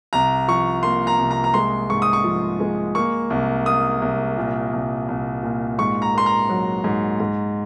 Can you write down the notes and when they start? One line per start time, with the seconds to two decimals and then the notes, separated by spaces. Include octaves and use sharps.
0.13 C2 A#5
0.48 F3 C#6
0.83 A#3 C6
1.07 A#5
1.19 C2
1.31 A#5
1.44 A#5
1.54 G#3 C6
1.90 G#2 C#6
2.02 D#6
2.13 C#6
2.24 F3
2.60 G#3
2.95 A#3 C#6
3.30 C2
3.66 A#3 D#6
4.02 C2
4.38 A#2
4.73 C2
5.08 C2
5.43 A#2
5.79 G#2 C#6
6.02 A#5
6.14 A#3 C6
6.26 A#5
6.49 F#3
6.84 G#2
7.20 G#2